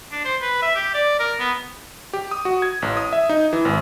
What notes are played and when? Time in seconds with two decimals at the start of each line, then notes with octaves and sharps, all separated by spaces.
0.12 D4
0.25 C5
0.42 B4
0.62 E5
0.76 G4
0.94 D5
1.20 A#4
1.39 B3
2.13 G4
2.31 D#6
2.45 F#4
2.62 G#6
2.82 A1
2.97 D#6
3.13 E5
3.29 D#4
3.53 E3
3.65 G#1